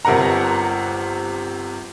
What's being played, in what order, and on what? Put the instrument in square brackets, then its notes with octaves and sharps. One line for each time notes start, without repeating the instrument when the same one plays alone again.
[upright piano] G1 C3 A#4 F#5 A#5